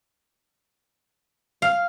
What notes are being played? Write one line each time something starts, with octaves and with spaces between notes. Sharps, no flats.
F5